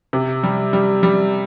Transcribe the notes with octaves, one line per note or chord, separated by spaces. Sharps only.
C3
G3
G3
G3